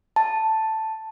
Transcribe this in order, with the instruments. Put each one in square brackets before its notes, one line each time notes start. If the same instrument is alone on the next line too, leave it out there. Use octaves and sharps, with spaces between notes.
[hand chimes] A5